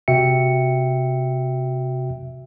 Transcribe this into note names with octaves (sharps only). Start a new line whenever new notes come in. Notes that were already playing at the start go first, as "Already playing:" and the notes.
C3 F#4 E5 G5 C#7